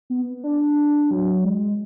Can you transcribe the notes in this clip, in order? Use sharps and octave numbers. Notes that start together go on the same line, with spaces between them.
B3
D4
F#3
G#3